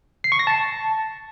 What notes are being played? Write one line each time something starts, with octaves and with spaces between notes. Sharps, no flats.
C7
C#6
A#6
A5